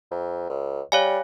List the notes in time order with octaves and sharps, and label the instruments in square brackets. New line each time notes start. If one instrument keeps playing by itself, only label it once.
[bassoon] F2
C#2
[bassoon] G3 [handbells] C#5 F5 G#5